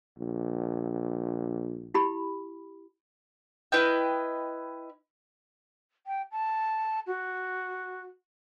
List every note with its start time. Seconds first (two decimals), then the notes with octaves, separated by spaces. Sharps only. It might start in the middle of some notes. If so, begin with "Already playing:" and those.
0.19 A#1
1.94 E4 G4 B5
3.72 E4 B4 D#5 G5
6.07 G5
6.32 A5
7.07 F#4